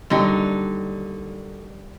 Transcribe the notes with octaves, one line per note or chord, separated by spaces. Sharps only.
D#2 D3 F#3 G3 D#4 G5